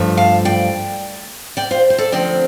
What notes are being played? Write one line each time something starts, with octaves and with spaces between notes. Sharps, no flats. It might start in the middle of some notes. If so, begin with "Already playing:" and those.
Already playing: G2 F3 A3
F5 A5
D5 G5
D5 G5
C5 F5
C5
A4 D5
D2 D3 F3 C4 D5 G5